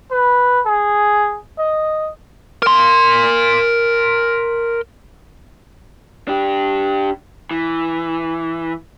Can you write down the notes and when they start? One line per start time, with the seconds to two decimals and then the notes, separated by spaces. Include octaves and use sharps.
0.11 B4
0.66 G#4
1.58 D#5
2.62 A#4 C6
6.28 D4 G4
7.51 E3